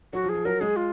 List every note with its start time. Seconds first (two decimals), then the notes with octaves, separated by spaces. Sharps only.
0.13 F#3 F#4
0.24 F3
0.29 G#4
0.35 F3
0.45 F#3 A#4
0.60 G#3 G#4
0.76 F4